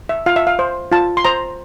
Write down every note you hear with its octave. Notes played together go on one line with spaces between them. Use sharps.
E5
F4 F5
E5
F5
C5
F4 A5
C6
C5 A#5